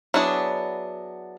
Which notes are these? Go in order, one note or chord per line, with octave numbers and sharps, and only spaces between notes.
F#3 B3 D4 E4 G#4